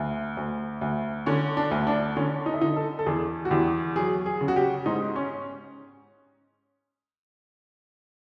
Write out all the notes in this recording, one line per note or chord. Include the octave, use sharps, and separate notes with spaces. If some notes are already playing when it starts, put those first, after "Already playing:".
Already playing: D2
D2
D2
D3 C#4
D4
D2
D4
D3 C#4
D#4
E4
D3 D#4
A4
A4
E2 G#4
F#4
E2 G4
F#3 G#4
G#4
C#3
F#4
G4
G#2 D#4
C#4